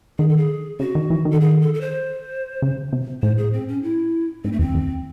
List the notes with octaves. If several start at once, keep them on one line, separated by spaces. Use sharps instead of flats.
D#3 G#4
A4
G#4
C#3 F#4
D#3
E3
D#3
A4
G#4
A4
A4
C5
C#3
C3
A2 C5
G#4
C4
C#4
E4
G#2 C4
A3
E2 C4
E2